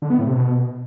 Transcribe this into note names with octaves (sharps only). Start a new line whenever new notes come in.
D3
B3
A2
C3
B2